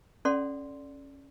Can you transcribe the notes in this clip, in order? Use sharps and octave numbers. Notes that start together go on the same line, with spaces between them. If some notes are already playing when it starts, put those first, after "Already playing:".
C#4 A4 D5 F#5 C6